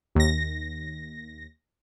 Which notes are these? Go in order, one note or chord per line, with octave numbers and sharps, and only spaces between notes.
D#2 A#6